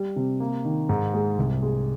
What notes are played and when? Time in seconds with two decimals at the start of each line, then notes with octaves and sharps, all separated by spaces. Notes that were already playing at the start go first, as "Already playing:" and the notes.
Already playing: G3
0.16 C3
0.40 A#3
0.65 D#3
0.89 G#2
1.14 G#3
1.38 C2
1.62 G#3